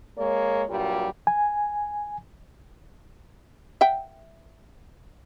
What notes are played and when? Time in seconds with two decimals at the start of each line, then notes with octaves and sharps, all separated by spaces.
0.18 G#3 A#3 C#5
0.69 G2 A#2 F#3 G3
1.27 G#5
3.81 E5 F#5 G5